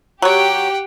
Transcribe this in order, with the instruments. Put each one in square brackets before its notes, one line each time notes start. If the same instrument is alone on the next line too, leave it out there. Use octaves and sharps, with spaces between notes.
[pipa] F#3 C#5 [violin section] G4 [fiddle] F#5 G5